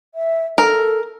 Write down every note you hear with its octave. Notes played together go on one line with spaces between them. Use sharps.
E5
A4 A#4